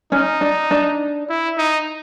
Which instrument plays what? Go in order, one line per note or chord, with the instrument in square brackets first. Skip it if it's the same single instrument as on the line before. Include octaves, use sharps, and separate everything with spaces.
[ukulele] C#4 [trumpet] D#4
[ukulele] D4
D4
[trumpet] E4
D#4